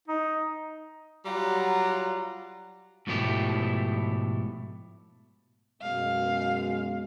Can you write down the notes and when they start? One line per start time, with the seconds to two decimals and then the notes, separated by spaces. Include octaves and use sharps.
0.08 D#4
1.25 F#3 G3 F4 F#5 A#5
3.07 G#2 B2 F3 A3 E4 G4
5.82 F#2 B2 G#3 F5